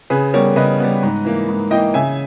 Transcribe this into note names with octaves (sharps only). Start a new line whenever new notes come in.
C#3 G#4 B4
G3 B3 A#4 C#5
C#3 B4 D#5
G3 B3
G#2
E3 A#3
G#2
E3 A#3 D#5 G5
C#3 E5 G#5